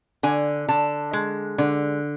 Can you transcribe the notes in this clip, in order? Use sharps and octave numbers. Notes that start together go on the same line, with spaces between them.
D3 G#5
D3 A5
G#3
D3